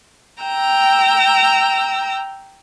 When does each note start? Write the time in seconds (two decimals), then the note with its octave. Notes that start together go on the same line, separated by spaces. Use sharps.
0.42 G5 A#5 E6